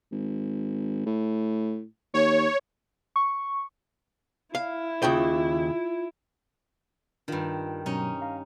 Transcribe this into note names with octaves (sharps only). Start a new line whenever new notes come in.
G#1
A2
D#2 C#5
C#6
E4 F5
D#2 C#3 F4 G5
G2 D#3 D4 F4
B2 F#3 C#4 D#4
F5 A#5